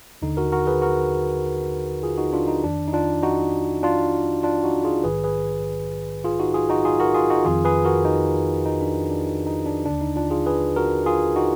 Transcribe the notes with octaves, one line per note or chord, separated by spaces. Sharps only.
D#2 D3 D#4
F#4 A#4
F#4 A#4
G#4 B4
F#4 A#4
F4 G#4
D#4 F#4
D4 F4
D#4
F2 D#3 D4
D#4
D4 F4
D#4 F#4
D4 F4
D4 F4
D#4 F#4
F4 G#4
A#1 G#2 D#3 G#4 B4
G#4 B4
F4 G#4
D#4 F#4
F4 G#4
D#4 F#4
F4 G#4
F#4 A#4
F4 G#4
D#4 F#4
F2 D#3 F4 G#4
G#4 B4
F#4 A#4
D#4
D#4
D4
D4
D#4
D#4
D4
D#2 D3 D4
D#4
D4 F4
F4 G#4
G#4 B4
F#4 A#4
F4 G#4
D#4 F#4